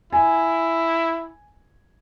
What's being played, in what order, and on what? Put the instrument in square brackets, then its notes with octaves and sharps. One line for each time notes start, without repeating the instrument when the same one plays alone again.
[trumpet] E4 [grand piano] G#5